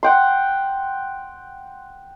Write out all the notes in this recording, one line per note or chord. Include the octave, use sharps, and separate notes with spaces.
F#5 G5 C6